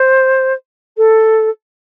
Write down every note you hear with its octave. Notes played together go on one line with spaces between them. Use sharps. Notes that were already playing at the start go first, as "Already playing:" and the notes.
Already playing: C5
A4